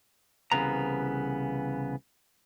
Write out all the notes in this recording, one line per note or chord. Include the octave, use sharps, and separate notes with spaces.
C2 F2 C#3 E3 B3 A#5